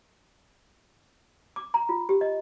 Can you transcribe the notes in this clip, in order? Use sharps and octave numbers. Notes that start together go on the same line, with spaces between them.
D6
A#5
F4
G4
D#5